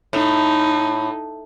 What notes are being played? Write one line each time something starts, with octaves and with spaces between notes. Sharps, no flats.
A2 D#4 E4